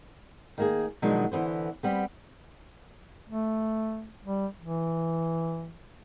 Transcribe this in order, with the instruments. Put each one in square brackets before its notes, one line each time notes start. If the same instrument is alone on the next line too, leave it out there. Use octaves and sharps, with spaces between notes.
[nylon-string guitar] D#3 A#3 G#4
B2 D#3 F3 F#3 G#3 D4
D3 E3 F3 B3 C5
G3 B3 C4
[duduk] A3
G3
E3